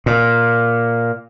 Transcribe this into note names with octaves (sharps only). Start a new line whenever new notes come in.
A#2